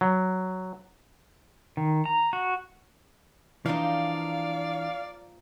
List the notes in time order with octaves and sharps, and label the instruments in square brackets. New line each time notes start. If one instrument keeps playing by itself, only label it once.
[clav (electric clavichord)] F#3
[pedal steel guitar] D#3
A#5
F#4
[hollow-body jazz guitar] E3 D4 [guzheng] F3 A#3 D#4 [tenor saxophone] D5 [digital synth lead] F5